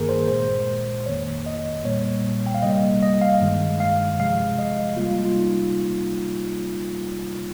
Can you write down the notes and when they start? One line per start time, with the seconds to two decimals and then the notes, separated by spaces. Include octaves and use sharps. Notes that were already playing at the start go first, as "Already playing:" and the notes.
Already playing: G2 D#3 A#3 G#4 A#4
0.09 C5
0.28 A#2 G#3 C5
1.06 F2 D#3 A#3 C#5
1.46 D#5
1.85 A#2 G3 A#3 C#5
2.46 G5
2.54 F5
2.63 C3 G3 A#3 D#5
3.03 D#5
3.22 F5
3.41 G2 D#3 G#3
3.80 F5
4.19 C3 F3 G#3 F5
4.59 D#5
4.97 C3 G3 A#3 F4
5.25 F4
5.36 D#4